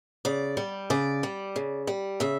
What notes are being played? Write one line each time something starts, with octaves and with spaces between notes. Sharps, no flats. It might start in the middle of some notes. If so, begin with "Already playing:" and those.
C#3 D5
G3
C#3 D5
G3
C#3
G3
C#3 E5